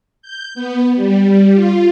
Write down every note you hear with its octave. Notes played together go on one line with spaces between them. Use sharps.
G6
B3
G3
F4